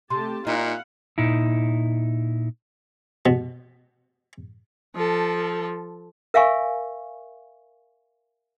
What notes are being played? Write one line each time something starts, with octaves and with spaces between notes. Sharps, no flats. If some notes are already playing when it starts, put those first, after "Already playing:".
C3 A3 G4 A5 C6
A#2 D#4 E4 F5 F#5
A#2 D#4 E4
B2
F3 A4
A#4 E5 F5 G#5 C#6